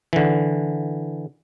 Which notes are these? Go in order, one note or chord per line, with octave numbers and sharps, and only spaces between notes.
D3 E3